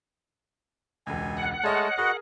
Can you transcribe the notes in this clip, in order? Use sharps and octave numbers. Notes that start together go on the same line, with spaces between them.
E1 C#2 G#5
F#5
G#3 A3 C#5 D#5 A5 F6
F#4 G#4 A#4 B4 D#5